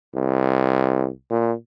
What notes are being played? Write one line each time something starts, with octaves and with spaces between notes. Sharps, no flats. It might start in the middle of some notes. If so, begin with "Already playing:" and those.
C2
A#2